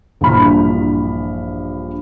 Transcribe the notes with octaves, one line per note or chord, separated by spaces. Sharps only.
A#1 G2 E3 B5 F6